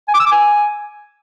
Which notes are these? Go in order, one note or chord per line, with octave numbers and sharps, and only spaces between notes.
G#5
D6
E6
D6
G#5